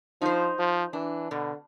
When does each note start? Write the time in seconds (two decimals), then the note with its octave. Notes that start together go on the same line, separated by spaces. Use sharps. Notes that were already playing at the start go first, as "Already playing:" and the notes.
0.21 F3 D#4 C5
0.59 F3
0.93 E3 D4
1.31 B2 D3